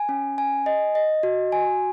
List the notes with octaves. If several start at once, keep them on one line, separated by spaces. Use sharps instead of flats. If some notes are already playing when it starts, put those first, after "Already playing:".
Already playing: G#5
C#4
G#5
D#5
D#5
F#4
G#5